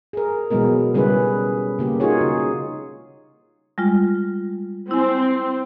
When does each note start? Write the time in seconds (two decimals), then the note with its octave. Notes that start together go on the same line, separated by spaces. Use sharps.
0.13 G#4 A#4
0.51 B2 E3 F#3 G#3 B3 A#4
0.94 C#3 G3 C#4 E4 G#4 B4
1.79 C#3 A#3 G4
2.00 D#4 F4 F#4 G#4 C#5
2.21 C#3
3.78 G3 G#3 F4
4.91 C4 E4 G#5